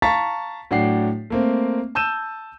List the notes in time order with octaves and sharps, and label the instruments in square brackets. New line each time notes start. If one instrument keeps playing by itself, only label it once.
[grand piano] F5 A5 A#5 C#6 A6 B6
A2 F#3 D4 F#5 G5 C7
A3 A#3 C4
A5 E6 G6 D#7 E7